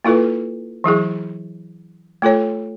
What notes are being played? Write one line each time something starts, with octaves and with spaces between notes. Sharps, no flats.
A#3 E4 F4 A4 B4
E3 F#3 E4 G#4
A3 F4 A4 C#5